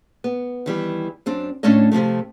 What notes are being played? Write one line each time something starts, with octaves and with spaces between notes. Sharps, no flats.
B3
D#3 E3 G3
F#2 C4 D4
A2 A3 C#4 D4 C#5 D#5
C3 D#3 F3 A3